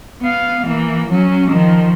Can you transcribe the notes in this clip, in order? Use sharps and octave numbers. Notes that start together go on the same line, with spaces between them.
B3 F5
E3 A#3
F#3 C#4
D#3 F3